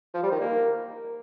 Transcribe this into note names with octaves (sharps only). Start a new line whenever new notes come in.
F3
G3
D#3
A#3